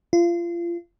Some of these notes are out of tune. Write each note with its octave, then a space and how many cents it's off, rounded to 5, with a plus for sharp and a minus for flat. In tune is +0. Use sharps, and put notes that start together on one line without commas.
F4 -30